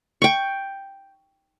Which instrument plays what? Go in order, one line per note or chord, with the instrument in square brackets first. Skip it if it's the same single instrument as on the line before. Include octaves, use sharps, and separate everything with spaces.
[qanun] G5 C#6